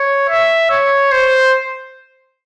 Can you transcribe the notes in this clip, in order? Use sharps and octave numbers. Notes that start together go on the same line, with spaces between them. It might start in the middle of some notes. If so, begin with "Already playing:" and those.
Already playing: C#5
E5
C#5
C5